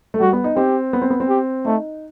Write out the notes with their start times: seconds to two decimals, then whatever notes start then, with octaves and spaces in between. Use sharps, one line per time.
0.14 A3
0.20 G3 F#4
0.33 B3
0.44 D#4
0.56 C4 G4
0.93 B3
1.02 C4
1.10 B3
1.20 C4
1.29 G4
1.65 A3 D#4